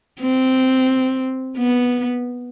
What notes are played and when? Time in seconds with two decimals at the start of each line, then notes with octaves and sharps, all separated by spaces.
0.20 C4
1.57 B3